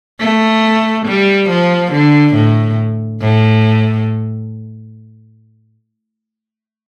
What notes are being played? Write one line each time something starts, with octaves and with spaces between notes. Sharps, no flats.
A3
G3
F3
D3
A2
A2